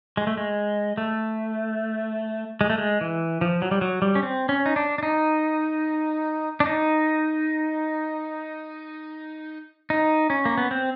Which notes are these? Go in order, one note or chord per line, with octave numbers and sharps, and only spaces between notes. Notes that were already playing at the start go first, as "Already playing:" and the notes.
G#3
A3
G#3
A3
G#3
A3
G#3
E3
F3
F#3
G3
F#3
G3
C#4
C4
C#4
D#4
D4
D4
D#4
D4
D#4
D#4
C#4
A#3
B3
C4